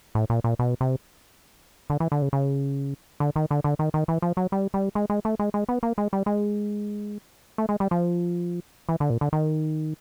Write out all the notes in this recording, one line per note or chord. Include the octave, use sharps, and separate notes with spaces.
A2
A#2
A#2
B2
C3
D3
E3
D3
C#3
C#3
D3
D#3
D3
D3
D#3
D#3
E3
F3
F#3
G3
G3
G#3
G#3
A3
G#3
G#3
B3
A#3
G#3
G3
G#3
A3
G#3
G3
F3
E3
D3
A#2
D3
D#3